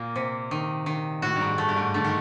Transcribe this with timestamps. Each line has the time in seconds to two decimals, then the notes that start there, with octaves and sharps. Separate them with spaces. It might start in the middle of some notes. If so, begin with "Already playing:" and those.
Already playing: A#2 A#3
0.16 C3
0.51 D#3
0.86 D#3
1.22 A2 F#4
1.36 G2
1.41 G#2
1.58 A3
1.69 G2
1.76 G#2
1.94 D3 A3
2.04 D#3